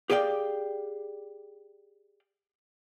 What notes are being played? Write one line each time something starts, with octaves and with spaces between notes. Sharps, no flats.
G4 G#4 D5 F5 G5